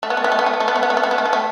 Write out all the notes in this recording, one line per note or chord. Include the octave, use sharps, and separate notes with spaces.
A3
B3
A3
B3
A3
B3
A3
B3
A3
B3
A3
B3
A3
B3
A3
B3
A3
B3
A3